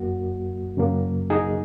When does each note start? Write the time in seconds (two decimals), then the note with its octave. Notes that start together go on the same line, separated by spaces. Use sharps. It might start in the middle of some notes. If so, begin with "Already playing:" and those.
Already playing: F#2 F#3 A#3 F#4
0.77 F#2 C#3 F#3 A#3
1.30 D#4 G#4